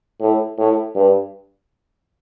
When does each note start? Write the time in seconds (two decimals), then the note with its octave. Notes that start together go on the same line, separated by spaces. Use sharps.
0.21 A2
0.58 A2
0.95 G2